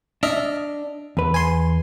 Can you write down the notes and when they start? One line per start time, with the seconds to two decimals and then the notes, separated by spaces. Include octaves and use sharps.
0.23 D4 D#5 E5 F6
1.17 E2 B4
1.34 G#5 C6